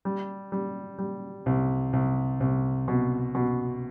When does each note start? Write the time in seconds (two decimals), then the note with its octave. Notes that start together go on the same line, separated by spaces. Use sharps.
0.05 G3
0.52 G3
0.98 G3
1.46 C2
1.93 C2
2.40 C2
2.88 B2
3.35 B2